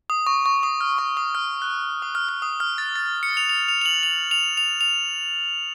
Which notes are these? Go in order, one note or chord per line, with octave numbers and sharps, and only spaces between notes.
D#6
C#6
C#6
D#6
F6
C#6
D#6
F6
F#6
D#6
F6
F6
D#6
F6
A6
A6
C#7
F7
F7
F7
F7
F#7
F7
F7
F7
F7